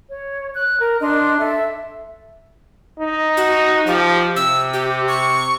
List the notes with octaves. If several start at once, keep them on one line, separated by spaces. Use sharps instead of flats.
C#5
F#6
A#4
D4 D#5 C6
A4 E5
D#4
F#4
F3 G4
C3 E6
G4
C#6